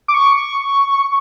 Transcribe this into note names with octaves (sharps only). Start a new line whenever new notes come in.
D6
C#6